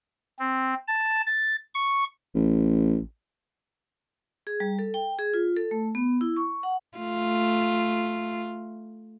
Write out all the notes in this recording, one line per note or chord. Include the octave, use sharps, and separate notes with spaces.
C4
A5
A6
C#6
A1
G#4
G3
A4
G5
G#4
F4
A4
A3
B3
E4
C#6
F#5
A3 F4